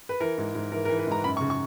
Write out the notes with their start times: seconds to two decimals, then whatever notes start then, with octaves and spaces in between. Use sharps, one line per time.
0.09 B4
0.20 E3 A#4
0.38 G#2
0.55 G#2
0.72 E3 A#4
0.85 A#4
0.89 E3
0.99 B4
1.07 G#2 A#5
1.24 F#2 B5
1.37 C#6
1.41 C#3
1.50 C#6